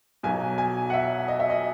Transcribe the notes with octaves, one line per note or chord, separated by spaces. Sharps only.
B1 B2 F#3 G#5
G#5
F#5
E5
D#5
E5
D#5